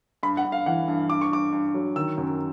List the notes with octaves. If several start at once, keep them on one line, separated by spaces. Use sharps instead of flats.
G2 B5
F#5
G2
F5
E3 F#5
G2
G2 D6
C#6
G2 D6
G2
F#3
D#3 E6
F#2